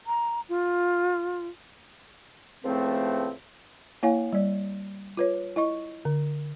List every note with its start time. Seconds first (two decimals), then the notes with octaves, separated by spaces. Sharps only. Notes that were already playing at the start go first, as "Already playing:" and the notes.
0.06 A#5
0.49 F4
2.64 C#2 A2 F3 A3 C4
4.03 A#3 E4 C#5 F5 G#5
4.33 G3 D5
5.17 F4 B4 C#5
5.56 E4 D#5 C#6
6.05 D3